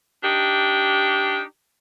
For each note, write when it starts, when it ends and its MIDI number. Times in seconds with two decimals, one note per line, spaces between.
0.23 1.42 62
0.23 1.42 63
0.23 1.42 67